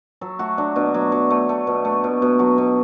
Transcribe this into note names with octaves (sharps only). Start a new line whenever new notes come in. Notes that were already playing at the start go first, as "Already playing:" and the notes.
F#3 A4
A3 F#4
F#3 D4
B2 D4
F#3
F#3
A3
A3
B2
A3
B2
B2
F#3 F#4
B2